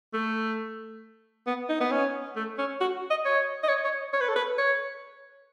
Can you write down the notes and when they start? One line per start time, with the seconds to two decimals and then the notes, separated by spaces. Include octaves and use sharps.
0.14 A3
1.47 B3
1.69 D#4
1.81 B3
1.91 C#4
2.36 A3
2.58 C#4
2.81 F#4
3.10 D#5
3.25 C#5
3.63 D#5
3.69 C#5
3.84 C#5
4.13 C#5
4.21 B4
4.28 A4
4.36 B4
4.58 C#5